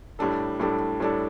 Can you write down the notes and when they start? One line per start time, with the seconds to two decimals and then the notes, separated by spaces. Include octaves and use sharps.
0.19 A2 G3 D4 A4
0.60 A2 G3 D4 A4
1.00 A2 G3 D4 A4